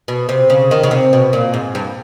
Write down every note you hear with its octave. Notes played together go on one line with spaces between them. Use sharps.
B2
C3
C#3
D#3
C#3
C3
B2
A#2
G#2
G2